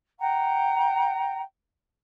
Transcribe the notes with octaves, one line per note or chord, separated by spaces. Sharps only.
F#5 G5 A#5